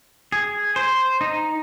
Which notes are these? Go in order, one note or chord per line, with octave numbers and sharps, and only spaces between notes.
G#4
C5
D#4